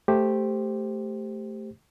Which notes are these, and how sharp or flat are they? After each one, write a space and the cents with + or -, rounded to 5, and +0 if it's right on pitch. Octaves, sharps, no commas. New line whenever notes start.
A3 +0 G4 +5 C5 +0